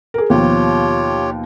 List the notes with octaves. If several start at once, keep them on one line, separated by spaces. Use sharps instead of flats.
G#4 A#4
D#2 B2 F3 F4 G4 C#5